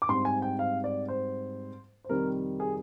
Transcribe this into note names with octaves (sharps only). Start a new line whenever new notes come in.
D6
G#2 G3 C4 C6
G#5
G5
F5
D5
C5
C5
F2 C3 D#3 G3 A#4
G#4